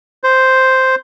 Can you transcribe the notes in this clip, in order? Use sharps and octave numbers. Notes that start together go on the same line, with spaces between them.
C5